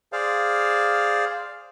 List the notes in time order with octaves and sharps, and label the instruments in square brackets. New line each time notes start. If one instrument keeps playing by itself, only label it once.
[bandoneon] G#4 C5 D5 F5